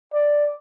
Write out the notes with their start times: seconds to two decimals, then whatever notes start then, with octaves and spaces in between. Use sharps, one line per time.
0.13 D5